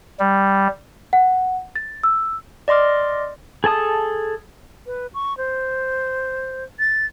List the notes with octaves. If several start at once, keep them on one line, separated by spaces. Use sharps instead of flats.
G3
F#5
A6
E6
D5 D#5 C6 D6 F6
G#4 A4 A5 D#6
B4
C#6
C5
A6